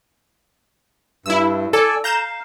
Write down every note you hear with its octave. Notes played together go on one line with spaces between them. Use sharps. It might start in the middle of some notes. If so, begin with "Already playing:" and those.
G2 E4 E6
A4 D5 G#5 E6
F5 A#5 G6 E7